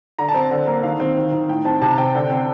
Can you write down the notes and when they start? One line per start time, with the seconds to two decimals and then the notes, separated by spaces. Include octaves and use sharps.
0.19 D3 A#5
0.29 A5
0.34 C4
0.51 D3
0.67 A#3
0.83 D#3 F5
1.00 C4
1.17 D#3
1.32 D#3
1.49 A2 G5
1.65 C4 A5
1.82 C3 A5
1.98 C4 G5
2.15 D3
2.30 C4